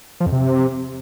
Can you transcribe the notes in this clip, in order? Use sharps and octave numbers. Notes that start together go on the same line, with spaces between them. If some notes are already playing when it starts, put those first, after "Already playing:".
F3
F2
C3